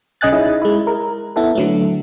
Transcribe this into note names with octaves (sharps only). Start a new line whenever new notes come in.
B1 C#3 D#5 G#5 F#6 A6
C#4 D#4 E4 G#4
G#3 E4
A#4
B3 E4 A4 B4
D3 F#3 A3